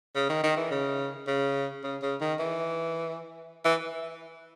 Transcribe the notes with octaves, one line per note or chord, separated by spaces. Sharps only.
C#3
D#3
D#3
E3
C#3
C#3
C#3
C#3
D#3
E3
E3